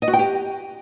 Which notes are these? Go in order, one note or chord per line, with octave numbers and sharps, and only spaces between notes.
D#5
F#4
G5
G4